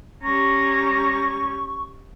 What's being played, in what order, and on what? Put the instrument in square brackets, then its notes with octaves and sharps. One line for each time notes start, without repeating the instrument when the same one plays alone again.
[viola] G3 C#4 [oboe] A#5 [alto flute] C#6